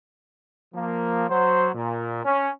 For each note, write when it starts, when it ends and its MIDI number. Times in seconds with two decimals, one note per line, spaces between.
0.75 1.25 53
0.75 1.25 58
1.30 1.69 54
1.30 1.69 72
1.75 2.21 46
2.25 2.50 61